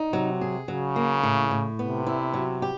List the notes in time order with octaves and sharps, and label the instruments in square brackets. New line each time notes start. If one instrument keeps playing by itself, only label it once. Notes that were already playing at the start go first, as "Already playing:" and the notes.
Already playing: [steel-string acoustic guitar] D#4
[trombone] C3 [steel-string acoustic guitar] F#3
[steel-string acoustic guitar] G#4
[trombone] C#3 [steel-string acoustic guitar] F#3
[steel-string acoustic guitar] A#3
A2
A2
[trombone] C3 [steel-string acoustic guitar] B3
[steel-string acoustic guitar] E4
F#3
G4